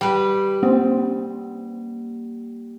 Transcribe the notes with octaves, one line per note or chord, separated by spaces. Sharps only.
G3 B4
A#3 C4